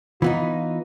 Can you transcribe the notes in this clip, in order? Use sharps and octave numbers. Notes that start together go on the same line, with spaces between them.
E3 B3 D#4 F4